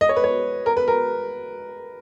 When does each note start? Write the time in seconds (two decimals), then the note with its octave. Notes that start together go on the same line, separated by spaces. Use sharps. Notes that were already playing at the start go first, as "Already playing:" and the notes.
0.01 D#5
0.09 C#5
0.16 B4
0.24 C#5
0.66 A#4
0.77 B4
0.88 A#4